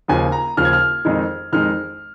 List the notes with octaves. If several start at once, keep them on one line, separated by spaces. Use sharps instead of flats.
D#2 C#3 F3 G#5
A#5
D#2 C#3 F3 F6
G#6
F6
F2 D#3 G#3 D#4
F2 D#3 G#3 D#4 F6